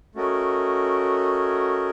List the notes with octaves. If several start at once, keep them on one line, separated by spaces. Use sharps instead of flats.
A3 C#4 F#4 A#4 D#5